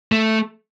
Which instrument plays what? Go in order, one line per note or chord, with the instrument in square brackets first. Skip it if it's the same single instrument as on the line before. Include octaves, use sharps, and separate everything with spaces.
[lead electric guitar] A3